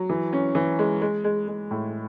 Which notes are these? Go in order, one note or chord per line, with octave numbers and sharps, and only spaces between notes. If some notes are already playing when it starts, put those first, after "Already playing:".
Already playing: F#3
E3
C#4
E3
G#3
G#3
G#3
G#3
A2